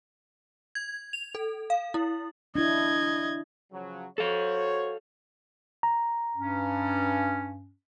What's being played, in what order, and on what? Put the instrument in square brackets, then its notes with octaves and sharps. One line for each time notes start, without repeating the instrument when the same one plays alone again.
[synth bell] G#6
F7
A4
F5
E4
[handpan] D4 E4 [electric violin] D#5 G#6
[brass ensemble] C#3 F3 F#3
[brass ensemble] F#4 C5 C#5 [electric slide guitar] A4 F5
[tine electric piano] A#5
[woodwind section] G2 C#4